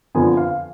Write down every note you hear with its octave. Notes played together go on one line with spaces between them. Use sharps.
F2 D3 F3 B3 G#5
F5